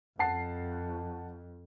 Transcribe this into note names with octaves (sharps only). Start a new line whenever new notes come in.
F2 F#5 A5 C7